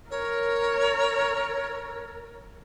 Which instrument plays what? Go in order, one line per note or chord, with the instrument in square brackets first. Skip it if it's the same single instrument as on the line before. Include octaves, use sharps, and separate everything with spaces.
[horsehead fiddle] A#4 [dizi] C#5